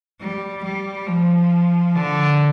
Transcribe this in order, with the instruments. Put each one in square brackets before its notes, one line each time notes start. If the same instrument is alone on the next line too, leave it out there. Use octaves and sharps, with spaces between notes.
[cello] G3
G3
F3
D3